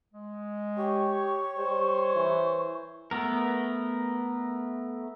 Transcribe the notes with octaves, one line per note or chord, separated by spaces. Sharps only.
G#3
G4 C#5 C#6
G3 C5
E3
A3 B3 A#4